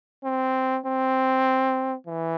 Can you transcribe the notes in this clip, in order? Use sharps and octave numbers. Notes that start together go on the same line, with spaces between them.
C4
C4
E3